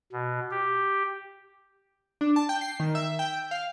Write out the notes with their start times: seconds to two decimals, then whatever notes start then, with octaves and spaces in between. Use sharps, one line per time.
0.12 B2
0.51 G4
2.21 D4
2.36 A5
2.49 G5
2.61 C7
2.80 D#3
2.95 E5
3.19 G5
3.51 F5